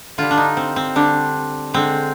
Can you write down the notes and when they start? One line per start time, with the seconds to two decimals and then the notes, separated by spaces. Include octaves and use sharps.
0.18 D3 G3 F4
0.31 D4
0.38 D#4
0.57 C4
0.76 C4
0.96 D3 G3 D4
1.74 D3 G#3 C4